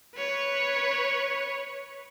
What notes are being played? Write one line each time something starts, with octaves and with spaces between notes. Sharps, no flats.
B4 C#5